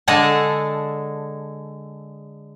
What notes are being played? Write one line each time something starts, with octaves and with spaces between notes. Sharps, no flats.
D3 G#3 G#4 A4 A5